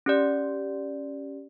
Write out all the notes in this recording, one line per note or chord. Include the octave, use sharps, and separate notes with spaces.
C#4 G4 D5